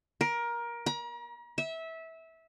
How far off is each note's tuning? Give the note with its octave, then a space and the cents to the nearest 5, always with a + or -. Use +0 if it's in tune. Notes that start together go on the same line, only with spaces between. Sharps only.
A#4 +20
A#5 +40
E5 -20